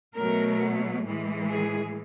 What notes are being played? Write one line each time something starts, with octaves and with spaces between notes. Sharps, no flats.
B2 F#3 A3 A#4
A2 E3 G#3
G#4